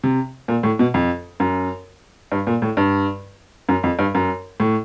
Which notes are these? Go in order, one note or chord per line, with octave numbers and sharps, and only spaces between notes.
C3
A#2
A2
B2
F2
F#2
G2
A#2
A2
G2
F#2
F2
G2
F#2
A2